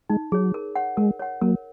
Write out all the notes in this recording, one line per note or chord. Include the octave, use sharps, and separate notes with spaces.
G#3 D#4
F#3 G#4 C#5
A#4
C#5 F#5
G#3 A#4
C#5 F#5
F#3 A#3 A#4